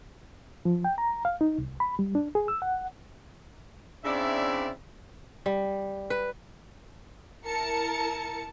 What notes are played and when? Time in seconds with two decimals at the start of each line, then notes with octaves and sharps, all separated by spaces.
0.65 F3
0.85 G5
0.98 A#5
1.25 F5
1.41 D#4
1.58 C2
1.80 B5
1.99 G3
2.15 D4
2.35 G#4
2.48 E6
2.62 F#5
4.05 C#3 C4 D4 E4 D5 E5
5.46 G3
6.10 B4
7.45 E4 A#4 A5 C#7